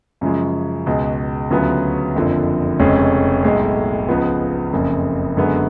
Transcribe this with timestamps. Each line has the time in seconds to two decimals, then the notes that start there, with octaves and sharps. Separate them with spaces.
0.21 F#2 C#3 F3 G#3
0.86 C#2 B2 G#3
1.51 D2 C#3 F#3 B3 F4
2.15 F#1 F2 D3 F3
2.79 F1 F2 C#3 G#3 C#4
3.44 B1 A2 G#3
4.09 C#2 C#3 F3 B3
4.73 F#1 F2 C#3
5.37 F#2 D3 G#3 B3